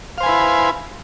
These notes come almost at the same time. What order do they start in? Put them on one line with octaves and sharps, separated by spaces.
F5 C5 G#5 B4 E4